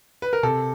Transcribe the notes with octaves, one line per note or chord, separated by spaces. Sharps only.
B4
A#4
C3 A4